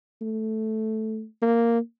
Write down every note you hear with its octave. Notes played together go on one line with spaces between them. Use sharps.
A3
A#3